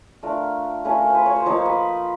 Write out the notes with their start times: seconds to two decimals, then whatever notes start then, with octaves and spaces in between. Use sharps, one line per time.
0.23 A3 D4 F4 A#4
0.85 A3 C#4 F4 B4
0.99 A#4
1.10 B4 C5
1.26 C#5
1.36 C5
1.46 F3 A#3 D#4 C#5
1.57 C5
1.66 B4